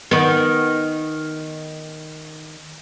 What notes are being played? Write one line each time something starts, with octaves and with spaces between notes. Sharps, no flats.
D#3 B3